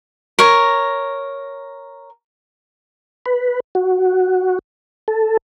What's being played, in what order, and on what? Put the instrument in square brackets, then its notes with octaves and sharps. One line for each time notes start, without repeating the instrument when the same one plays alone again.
[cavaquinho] A#4 C#5
[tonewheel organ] B4
F#4
A4